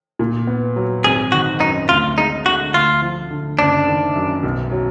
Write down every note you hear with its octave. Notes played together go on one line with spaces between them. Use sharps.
A#2
B3
F#3
G#1 G#4
D#3 F#4
F#2 D#4
D2 F4
G#3 D#4
D3 F#4
D2 F4
F3
D3
F#1 D4
D#3
F#2
B1
F#3